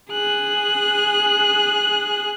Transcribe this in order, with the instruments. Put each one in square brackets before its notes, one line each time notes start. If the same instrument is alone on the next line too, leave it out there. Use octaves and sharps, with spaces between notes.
[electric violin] G#4 F#6